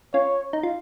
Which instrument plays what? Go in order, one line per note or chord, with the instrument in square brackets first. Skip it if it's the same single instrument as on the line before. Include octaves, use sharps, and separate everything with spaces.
[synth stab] C#4 F4 [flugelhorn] C#5
[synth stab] D#4
F4